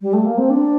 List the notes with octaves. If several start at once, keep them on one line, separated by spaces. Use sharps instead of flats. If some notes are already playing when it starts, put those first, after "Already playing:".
G3
A3
A#3
C4
D4